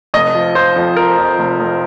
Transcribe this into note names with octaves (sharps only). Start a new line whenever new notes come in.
F1 D#5
F3
F3 C5
F2
F3 A#4
F2
F1
F1